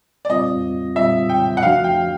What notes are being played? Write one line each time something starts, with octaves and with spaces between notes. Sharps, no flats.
D5
A#2 G3 C4 F4 D#5
A#2 G3 C4 F4 E5
G5
F#5
C3 F3 A3 D4 F#4 F5
G5